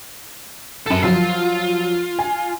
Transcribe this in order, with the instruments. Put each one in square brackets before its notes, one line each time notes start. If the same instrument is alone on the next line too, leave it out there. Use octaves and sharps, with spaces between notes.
[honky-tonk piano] F#2 E7 [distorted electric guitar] A4 B4
[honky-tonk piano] F3 F#3 C7 [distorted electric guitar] F4
[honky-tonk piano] G#5